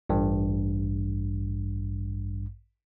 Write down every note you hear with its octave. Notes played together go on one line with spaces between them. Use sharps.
A1 G2